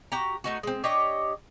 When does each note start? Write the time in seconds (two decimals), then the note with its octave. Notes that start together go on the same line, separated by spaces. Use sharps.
0.12 F#4 G4 A#5
0.44 A3 D#4 F#4
0.63 G#3 C4
0.84 D4 G4 C#5 D#5